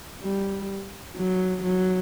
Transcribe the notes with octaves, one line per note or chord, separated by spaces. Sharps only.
G3
F#3
F#3